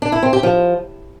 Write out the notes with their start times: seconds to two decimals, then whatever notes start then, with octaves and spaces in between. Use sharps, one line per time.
0.02 D4
0.12 E4
0.23 C4
0.33 G4
0.43 F3